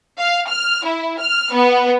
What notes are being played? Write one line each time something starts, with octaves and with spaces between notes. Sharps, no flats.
F5
F6
E4
F6
B3